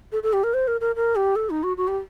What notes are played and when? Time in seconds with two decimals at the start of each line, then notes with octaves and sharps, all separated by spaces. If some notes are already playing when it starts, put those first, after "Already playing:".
0.12 A4
0.23 A4
0.33 G4
0.44 A#4
0.54 C5
0.68 A#4
0.81 A#4
0.96 A#4
1.16 G4
1.36 A4
1.50 D#4
1.63 F#4
1.77 F#4
1.88 G4